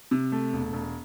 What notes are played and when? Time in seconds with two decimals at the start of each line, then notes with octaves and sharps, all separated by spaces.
0.11 C3
0.32 A3
0.53 E1
0.73 E1